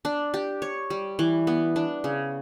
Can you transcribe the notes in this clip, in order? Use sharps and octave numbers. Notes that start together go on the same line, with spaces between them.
D4
G4
C#5
G3
E3
B3
D4
C#3